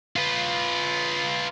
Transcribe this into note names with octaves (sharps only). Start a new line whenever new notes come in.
F4 B4